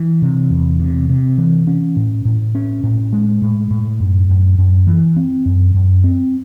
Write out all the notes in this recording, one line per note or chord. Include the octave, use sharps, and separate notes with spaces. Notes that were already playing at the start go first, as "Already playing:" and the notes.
Already playing: E3
C3
E2
C3
C3
E3
C#4
A2
A2
C#4
A2
G#3
A2
A2
F#2
F#2
F#2
E3
C4
F#2
F#2
C4